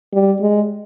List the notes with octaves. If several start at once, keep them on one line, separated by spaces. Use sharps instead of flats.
G3
G#3